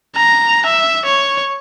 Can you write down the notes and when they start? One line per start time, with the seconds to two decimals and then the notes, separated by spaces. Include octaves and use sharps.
0.16 A#5
0.67 E5
1.05 C#5